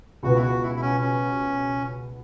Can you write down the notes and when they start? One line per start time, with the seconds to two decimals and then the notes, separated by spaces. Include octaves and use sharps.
0.23 C#2 B2 B3 F#4
0.36 E4
0.42 F#4
0.62 E4
0.76 E4
0.82 C#4
1.01 C#4